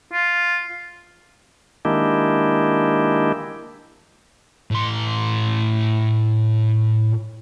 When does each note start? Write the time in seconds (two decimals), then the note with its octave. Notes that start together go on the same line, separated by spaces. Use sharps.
0.13 F4
1.85 D#3 G#3 A#3 D4 E4 G4
4.71 A2 C6